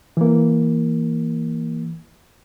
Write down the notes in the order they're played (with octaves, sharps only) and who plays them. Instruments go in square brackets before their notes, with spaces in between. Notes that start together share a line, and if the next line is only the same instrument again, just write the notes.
[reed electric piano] E3 A#3